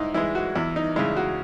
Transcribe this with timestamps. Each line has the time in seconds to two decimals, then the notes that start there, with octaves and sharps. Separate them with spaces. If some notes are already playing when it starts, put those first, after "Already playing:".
Already playing: G#2 D#4 E4
0.14 E3 G#3 E4
0.35 F#4
0.55 E2 E4
0.76 D#4
0.96 C#3 G#3 E4
1.17 F#4